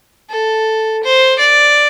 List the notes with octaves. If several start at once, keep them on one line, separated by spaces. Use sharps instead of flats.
A4
C5
D5